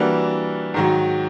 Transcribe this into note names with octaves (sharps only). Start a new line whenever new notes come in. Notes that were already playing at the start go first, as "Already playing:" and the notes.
Already playing: E3 G3 A#3 D4 F#4
G#2 D#3 F#3